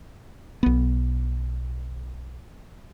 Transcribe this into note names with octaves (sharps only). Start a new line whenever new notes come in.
B1 B3